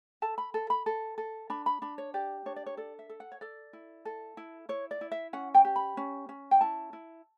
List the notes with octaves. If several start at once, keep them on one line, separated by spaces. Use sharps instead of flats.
A4 A5
B5
A4
B5
A4
A4
D4 B5
B5
D4 B5
C#5
G4 D5
D4 C#5
D5
C#5
A4 D5
E5
A4
F#5
C#5
A4 D5
E4
A4
E4
E4 C#5
D5
E4
E5
C#4 F#5
G5
G4
B5
C#4
C#4
G5
E4 A5
E4